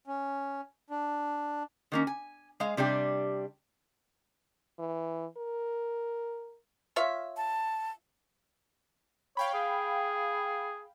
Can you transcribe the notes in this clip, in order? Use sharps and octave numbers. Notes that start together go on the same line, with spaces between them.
C#4
D4
D#3 A#3 C#4
G#5
G#3 G#4 F5
C3 G3 D4 G4
E3
A#4
F4 C#5 E5
A5
C#5 F5 G5 B5
G#4